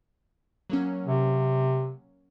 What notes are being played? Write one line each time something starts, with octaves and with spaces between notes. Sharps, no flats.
F#3 A#3 C#4
C3